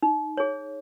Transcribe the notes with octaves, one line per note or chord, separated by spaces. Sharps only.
D#4
G#4 C#5